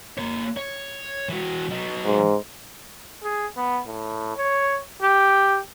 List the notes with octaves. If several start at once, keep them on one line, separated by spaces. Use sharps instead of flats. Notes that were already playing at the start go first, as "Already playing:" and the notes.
A#3 C#5
C#5
E3 F#4
F#3 D#4
G#2
G#4
B3
A2
C#5
G4